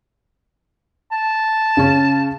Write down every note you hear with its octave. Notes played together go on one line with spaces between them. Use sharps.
A5
C#3 C#4